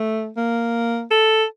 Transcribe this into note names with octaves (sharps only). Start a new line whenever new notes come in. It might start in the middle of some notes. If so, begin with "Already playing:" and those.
Already playing: A3
A#3
A4